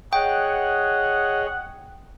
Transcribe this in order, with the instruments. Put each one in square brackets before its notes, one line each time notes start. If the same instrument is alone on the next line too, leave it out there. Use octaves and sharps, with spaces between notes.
[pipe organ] G#4 C#5 D#5 [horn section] F#5 [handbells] G5